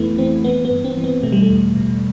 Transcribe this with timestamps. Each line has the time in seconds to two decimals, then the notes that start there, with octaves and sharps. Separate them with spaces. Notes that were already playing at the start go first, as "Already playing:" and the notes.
Already playing: F2 E3 A3 B3 E4
0.18 E3 C4
0.44 E3 B3
0.65 B3
0.71 G2
0.85 C4
0.98 E3
1.04 B3
1.23 B2 A3
1.32 G3
1.42 A3
1.50 E2
1.76 B2